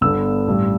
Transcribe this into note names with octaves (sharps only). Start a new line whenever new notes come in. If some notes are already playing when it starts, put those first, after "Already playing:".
G1 G2 D3 B3 E6
A1 G2 G3